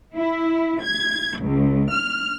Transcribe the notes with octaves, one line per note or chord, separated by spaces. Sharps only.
E4
G#6
C#2
F6